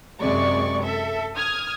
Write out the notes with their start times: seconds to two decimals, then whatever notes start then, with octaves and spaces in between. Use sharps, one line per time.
0.20 F#2 C3 G#3 D5 C#6
0.83 A4 E5
1.36 D#6 F6 G#6